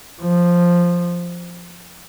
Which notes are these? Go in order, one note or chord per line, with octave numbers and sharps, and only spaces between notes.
F3